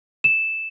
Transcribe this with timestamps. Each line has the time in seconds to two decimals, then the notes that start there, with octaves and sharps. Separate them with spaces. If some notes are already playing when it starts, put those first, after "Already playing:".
0.24 E7